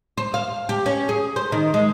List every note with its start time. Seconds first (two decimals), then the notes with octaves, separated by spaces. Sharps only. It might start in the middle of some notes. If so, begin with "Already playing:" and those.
0.17 C5
0.34 F5
0.69 G4
0.86 C#4
1.09 G#4
1.36 C5
1.52 D#3
1.74 G#3